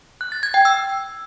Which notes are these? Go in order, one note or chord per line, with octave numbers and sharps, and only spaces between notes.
F#6
A6
G#6
G5
E6